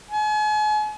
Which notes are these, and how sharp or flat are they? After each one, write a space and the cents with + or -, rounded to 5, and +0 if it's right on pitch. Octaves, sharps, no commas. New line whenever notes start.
G#5 +40